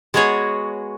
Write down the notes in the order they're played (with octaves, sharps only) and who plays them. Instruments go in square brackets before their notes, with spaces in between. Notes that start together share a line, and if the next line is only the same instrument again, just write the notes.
[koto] G#3 B3 F#4 G#4 C#5